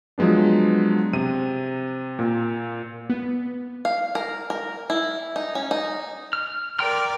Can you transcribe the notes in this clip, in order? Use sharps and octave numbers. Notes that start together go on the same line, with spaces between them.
F3 F#3 G#3 B3 D4
C3 D#7
A#2
B3
F5
A#4
A#4
E4
D#4
C#4
D#4
F6
A#4 D5 G5 C6 F6